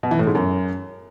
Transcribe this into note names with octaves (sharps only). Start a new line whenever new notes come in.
B2
E3
A2
G#2
F#2